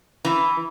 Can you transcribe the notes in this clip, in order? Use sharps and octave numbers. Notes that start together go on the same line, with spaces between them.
E3